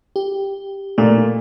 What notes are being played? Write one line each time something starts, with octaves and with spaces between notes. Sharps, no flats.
G4
A#2 A3